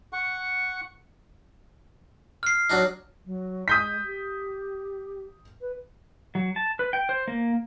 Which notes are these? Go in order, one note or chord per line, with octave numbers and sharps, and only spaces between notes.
F#5 C#6
F6 C7
F#3 D4 D#4
F#3
G#3 D#6 G6 B6
G4
B4
F#3
A5
B4
G5
C5
A#3